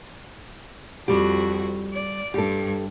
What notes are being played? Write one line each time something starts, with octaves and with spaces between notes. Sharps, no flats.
F2 G3 F#4 G4
D5
G2 G4 A4